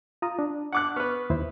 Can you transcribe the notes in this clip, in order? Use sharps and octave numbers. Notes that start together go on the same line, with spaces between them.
F4 A#5 D#6
D4
F#5 D6 F#6
B3 B4 C#6 F6
D#2 E4 C5